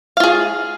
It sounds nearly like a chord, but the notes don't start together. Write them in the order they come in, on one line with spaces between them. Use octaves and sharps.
F5 F4 G#4